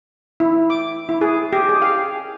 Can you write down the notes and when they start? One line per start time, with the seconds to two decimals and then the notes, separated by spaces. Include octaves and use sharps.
0.40 E4
0.70 D6
1.09 E4
1.21 G#4
1.53 G4
1.69 G#4
1.82 F5